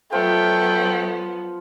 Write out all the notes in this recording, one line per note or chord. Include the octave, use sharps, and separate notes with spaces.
F3 F#3 A3 B3 F4 C5 G5